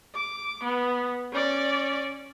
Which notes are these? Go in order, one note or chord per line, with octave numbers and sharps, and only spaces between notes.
D6
B3
C#4 D5